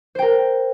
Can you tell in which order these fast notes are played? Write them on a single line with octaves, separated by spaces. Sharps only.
C5 G5 A#4